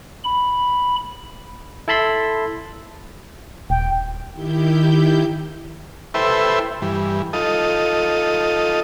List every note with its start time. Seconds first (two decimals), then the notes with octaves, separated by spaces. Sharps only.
0.24 B5
1.88 E4 A4 A5 B5 C6 E6
3.70 D#1 G5
4.33 D#3 E4 G4 G6
6.14 E4 A4 B4 C5 E5 G5
6.82 G2 E3
7.33 D#4 F4 A4 D#6